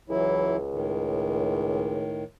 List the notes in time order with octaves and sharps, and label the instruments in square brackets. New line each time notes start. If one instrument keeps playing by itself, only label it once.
[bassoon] C#2 [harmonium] E3 F#3 E4
[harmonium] A2 D#3